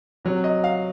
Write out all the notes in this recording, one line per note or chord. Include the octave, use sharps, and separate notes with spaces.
C3 F#3
D#5
F5